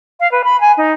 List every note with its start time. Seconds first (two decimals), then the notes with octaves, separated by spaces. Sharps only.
0.20 F5
0.31 B4
0.44 B5
0.60 G#5
0.77 D#4